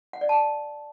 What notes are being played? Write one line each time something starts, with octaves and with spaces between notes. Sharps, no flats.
F#5
D5
A5